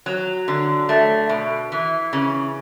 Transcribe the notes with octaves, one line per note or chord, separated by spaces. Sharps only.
F#3
D3
A3
B2
E3
C#3